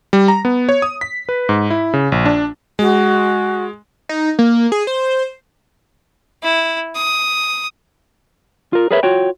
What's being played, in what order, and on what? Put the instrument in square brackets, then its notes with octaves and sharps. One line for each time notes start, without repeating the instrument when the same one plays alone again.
[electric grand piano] G3
A#5
B3
C#5
D#6
B6
B4
G#2
E4
C#3
A#1
D4
[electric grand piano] G#3 [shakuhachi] F#4
[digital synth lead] D#4
A#3
G#4
C5
[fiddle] E4
D#6
[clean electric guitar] F4 A#4
G#4 A#4 B4 C#5 E5
F4 F#4 C#5 G5